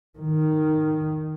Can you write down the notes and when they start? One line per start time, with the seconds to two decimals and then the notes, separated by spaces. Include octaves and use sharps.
0.19 D#3